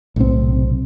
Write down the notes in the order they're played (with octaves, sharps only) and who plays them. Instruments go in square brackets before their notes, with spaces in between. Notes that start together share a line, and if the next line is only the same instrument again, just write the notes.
[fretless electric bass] B1 A2 C3 C4